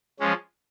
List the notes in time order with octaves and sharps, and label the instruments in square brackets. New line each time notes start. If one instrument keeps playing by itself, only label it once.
[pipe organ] F3 G#3 C#4